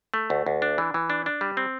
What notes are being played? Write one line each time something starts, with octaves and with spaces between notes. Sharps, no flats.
A3
D2
D2
D4
E3
E3
D4
D4
G3
C4